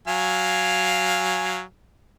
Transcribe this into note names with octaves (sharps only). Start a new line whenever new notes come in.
F#3 F5 G#5